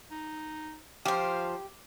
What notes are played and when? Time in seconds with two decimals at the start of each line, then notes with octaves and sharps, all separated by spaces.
0.11 D#4
1.05 F3 G4 C5 F5